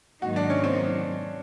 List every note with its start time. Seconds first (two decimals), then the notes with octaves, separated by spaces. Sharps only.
0.22 G#2 D#3 F#3 A#3 D#4 F#4
0.36 D4
0.50 C#4
0.64 C4